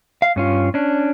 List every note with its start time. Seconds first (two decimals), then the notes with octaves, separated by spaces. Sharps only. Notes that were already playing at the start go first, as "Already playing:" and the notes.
0.22 F5
0.36 G2 C#4 F4
0.74 C#4 D4